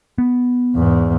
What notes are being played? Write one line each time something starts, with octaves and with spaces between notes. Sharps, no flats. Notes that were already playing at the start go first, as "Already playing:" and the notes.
B3
E2 G#2